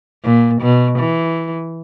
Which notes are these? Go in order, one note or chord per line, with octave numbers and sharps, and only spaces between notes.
A#2
B2
E3